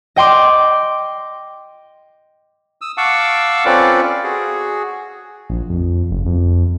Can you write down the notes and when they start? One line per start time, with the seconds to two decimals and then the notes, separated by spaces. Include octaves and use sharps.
0.16 D#5 G5 C6 D6
2.81 D#6 E6
2.97 F5 F#5 A5 C#6 D6 E6
3.65 C4 C#4 F4 A4 B4 D5
4.24 F#4 G#4
5.50 A#1
5.70 F2
6.11 F#1
6.26 F2